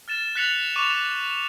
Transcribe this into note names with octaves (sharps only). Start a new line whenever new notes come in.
F6 A6 E7
F#6 A6 B6 C#7 F7 F#7
C#6 D6 D#7 F7